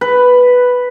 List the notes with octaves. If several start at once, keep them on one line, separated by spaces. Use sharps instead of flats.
B4